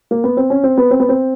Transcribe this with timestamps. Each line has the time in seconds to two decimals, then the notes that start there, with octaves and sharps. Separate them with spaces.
0.11 A#3
0.24 B3
0.37 C4
0.50 C#4
0.64 C4
0.78 B3
0.91 C4
1.00 B3
1.09 C4